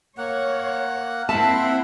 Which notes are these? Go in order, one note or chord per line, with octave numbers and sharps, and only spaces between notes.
A#3 C#5 F#5
A#3 C4 E4 E5 F#5 A5 B5